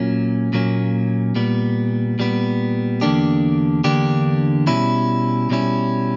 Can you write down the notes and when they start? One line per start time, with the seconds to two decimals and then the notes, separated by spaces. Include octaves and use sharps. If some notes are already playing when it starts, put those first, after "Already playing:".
Already playing: A#2 F#3 A#3 C#4
0.53 A#2 F#3 A#3 C#4
1.35 A#2 G3 B3
2.19 A#2 G3 B3
3.01 E2 D3 A#3 D4 G4
3.84 E2 D3 A#3 D4 G4
4.67 B2 G3 C#4 E4
5.50 B2 G3 C#4 E4